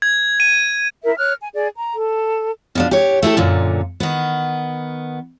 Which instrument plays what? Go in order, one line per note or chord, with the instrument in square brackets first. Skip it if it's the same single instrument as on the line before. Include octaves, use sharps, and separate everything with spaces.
[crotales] G#6
D#7
[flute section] E4 A#4 E5
C#5 F6 F#6
G#5
G#4 D5
A#5
A4
[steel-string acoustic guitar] B2 F3 D4
G4 C#5
A3 E4 G4 A4
F#2 A#2 D3
D#3 B3